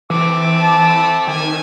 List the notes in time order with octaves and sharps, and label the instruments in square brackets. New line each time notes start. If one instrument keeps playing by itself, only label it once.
[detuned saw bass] E3 [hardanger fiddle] A3 C4 [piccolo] D6
[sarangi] A5
[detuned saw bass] D#3 [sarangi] G#5